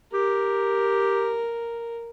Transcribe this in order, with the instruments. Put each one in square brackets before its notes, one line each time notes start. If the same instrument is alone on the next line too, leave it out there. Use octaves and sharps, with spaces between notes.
[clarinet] G4 [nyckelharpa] A#4